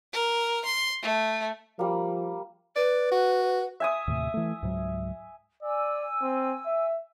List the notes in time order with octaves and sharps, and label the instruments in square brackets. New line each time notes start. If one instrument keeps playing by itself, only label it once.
[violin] A#4
C6
A3
[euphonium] F3 [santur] G3 A#3
[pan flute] B4 [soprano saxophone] D5
[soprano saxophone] F#4
[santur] E5 G#5 D#6
[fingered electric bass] D#2 A2 C3
E3 A3
C#2 G#2 F#3
[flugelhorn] D5 [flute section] G#5 E6
[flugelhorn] C4
E5